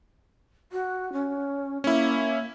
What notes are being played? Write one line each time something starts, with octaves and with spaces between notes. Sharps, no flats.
F#4
C#4
A#3 C#4 E4